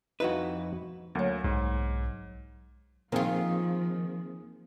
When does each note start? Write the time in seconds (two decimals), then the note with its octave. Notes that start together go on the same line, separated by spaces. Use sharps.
0.20 F2 D#4 E4 F#4 B4
1.15 D2 F#3 A#3 C#5
1.44 B1 G#2
3.12 D#3 F3 A#3 C4 F4 G#4